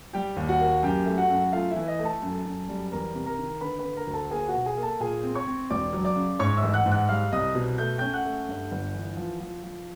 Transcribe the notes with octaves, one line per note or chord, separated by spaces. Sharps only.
G3 G4 G5
D#2
F#4 F#5
A#3
F#2 G4 G5
A3
F#4 F#5
F#2
A3 F4 F5
E4 E5
E3
D#5
A3
A4 A5
F#2
F#2
G3
E2 A#4 A#5
C3
A#4 A#5
D#3
D3 B4 B5
B4 B5
D3
A#4 A#5
D2
A4 A5
A#3 G#4 G#5
F#4 F#5
B2
G#4 G#5
A#3
A4 A5
A#2 G#4 G#5
C4
C#5 C#6
C4
E1 D5 D6
F#3
D5 D6
C#3
G#2 C#5 C#6
E5 E6
A1
F#5 F#6
G#2
F#5 F#6
G3 F5 F6
C2 D#5 D#6
B2
A3 G6
C#4 G5 G6
F#5 F#6
A3
G2
G1
E3
F3
F3
F3